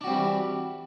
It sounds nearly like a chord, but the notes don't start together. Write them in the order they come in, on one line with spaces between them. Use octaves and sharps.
D4 F#4 C4 G3 E3